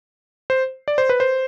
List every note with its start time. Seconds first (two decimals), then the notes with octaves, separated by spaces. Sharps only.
0.50 C5
0.88 D5
0.98 C5
1.09 B4
1.20 C5